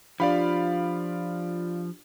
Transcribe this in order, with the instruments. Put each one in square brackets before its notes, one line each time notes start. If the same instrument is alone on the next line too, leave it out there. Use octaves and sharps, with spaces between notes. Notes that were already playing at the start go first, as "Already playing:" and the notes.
[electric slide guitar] F3 [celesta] D4 F4 G4 [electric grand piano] D5 F5 B5